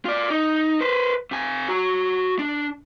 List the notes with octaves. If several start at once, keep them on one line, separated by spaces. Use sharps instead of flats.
F4 D5
D#4
B4 C5
C3 G#5
F#4 A#5
D4